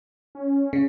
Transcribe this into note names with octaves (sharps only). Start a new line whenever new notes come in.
C#4
C#3